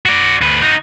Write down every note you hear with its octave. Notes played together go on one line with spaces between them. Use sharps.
F#4 D5
D2 B4
D#4 F#4